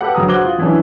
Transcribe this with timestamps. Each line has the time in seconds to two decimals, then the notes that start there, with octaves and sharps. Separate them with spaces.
0.01 G4 A4 B4 F#5
0.15 G1 F#2 C#3 F#4 A#5 D#6
0.28 F#4 C5 D6 F#6 G#6 G7
0.45 F4
0.59 F#2 E3 G#3 C#4 D4 E4